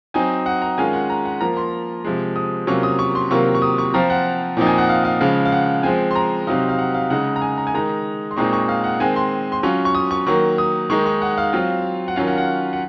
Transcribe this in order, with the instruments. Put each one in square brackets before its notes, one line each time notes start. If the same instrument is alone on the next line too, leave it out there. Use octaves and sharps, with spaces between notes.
[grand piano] F#3 C4 D#4 G#5
F#5
A#5
D#3 G#3 C#4 F4 G#5
F#5
A#5
F#5
F3 A#3 F4 A#5
C6
C3 F3 G#3
D#6
C3 F#3 A#3 C#4 F4 C#6
D#6
C#6
C6
C3 D#3 F#3 A#3 F4 C#6
C#6
D#6
C#6
F3 C4 F4 A#5
F#5
A#2 F3 C4 D#4
G#5
F#5
F5
F5
C#3 F3 G#3 F5
F5
F#5
F3 G#3 C4 G#5
C6
A#5
C3 F#3 C4 D#4 F5
F5
F#5
F5
C#3 G#3 D#4 F#5
A#5
G#5
A#5
G#5
D#3 G#3 D#4 A#5
C6
A#2 G#3 C4 D#4 C#6
C#6
F5
F#5
D#3 G#3 C4 G#5
C6
C6
F#3 C#4 F4 C#6
C#6
D#6
C#6
D#3 F#3 A#3 C#6
D#6
D#3 G#3 D#4 C#6
C#6
F#5
F5
F#3 C4 F4
F#5
D#3 F#3 C#4 F4 F5
F#5
F#5
F#5